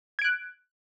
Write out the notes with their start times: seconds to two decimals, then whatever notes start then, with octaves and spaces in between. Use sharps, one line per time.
0.19 G#6
0.22 D7
0.24 F#6